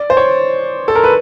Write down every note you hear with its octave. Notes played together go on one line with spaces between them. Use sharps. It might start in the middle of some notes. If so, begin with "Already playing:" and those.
Already playing: D5
C5
C#5
A4
A#4
B4